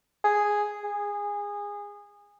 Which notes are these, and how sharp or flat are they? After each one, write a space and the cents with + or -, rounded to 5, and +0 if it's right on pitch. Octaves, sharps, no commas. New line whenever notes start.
G#4 -5
G#4 -20